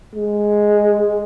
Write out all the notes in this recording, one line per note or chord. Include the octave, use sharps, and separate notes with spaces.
G#3